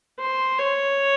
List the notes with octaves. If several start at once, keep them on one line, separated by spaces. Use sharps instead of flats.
C5
C#5